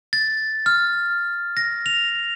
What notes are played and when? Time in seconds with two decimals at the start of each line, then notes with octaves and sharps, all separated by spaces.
0.13 A6
0.66 F6
1.57 A#6
1.86 F7